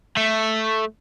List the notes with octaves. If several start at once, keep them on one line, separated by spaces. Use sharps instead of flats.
A3